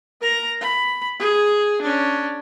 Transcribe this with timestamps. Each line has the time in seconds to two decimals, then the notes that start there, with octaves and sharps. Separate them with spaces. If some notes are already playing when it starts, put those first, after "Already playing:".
0.21 A#4 A#5
0.61 B5
1.20 G#4
1.82 C#4 D4